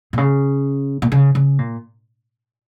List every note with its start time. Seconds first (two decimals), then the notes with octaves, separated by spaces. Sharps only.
0.13 A#2
0.18 C#3
1.02 A#2
1.12 C#3
1.35 C#3
1.59 A#2